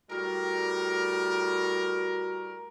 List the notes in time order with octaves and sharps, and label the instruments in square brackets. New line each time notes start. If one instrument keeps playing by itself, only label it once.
[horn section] A2 G3 A#4 [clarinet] F#4